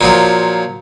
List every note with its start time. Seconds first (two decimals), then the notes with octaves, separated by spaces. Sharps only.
0.01 A#2 F3 F#3